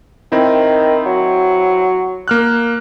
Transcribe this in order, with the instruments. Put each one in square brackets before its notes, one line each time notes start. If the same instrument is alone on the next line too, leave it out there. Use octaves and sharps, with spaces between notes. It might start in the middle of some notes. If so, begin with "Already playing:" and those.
[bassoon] D#3 [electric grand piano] C4 E4
[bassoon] F#3
[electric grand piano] A#3 F6 F#6